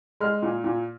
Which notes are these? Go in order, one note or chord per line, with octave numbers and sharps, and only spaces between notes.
G#3 F6
A#2
A#2